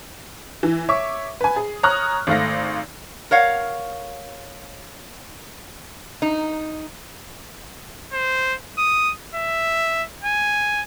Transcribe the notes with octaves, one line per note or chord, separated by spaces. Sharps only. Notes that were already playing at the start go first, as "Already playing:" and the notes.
E3
C#5 E5 C#6 D6
B4 G#5
G#4
C#5 A#5 C#6 D#6 F6 F#6
G#1 A3 F5 A#6
A#4 C#5 F5 F#5
D#4
C5
D#6
E5
G#5